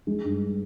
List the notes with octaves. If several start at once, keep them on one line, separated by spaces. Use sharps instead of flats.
G#3
G2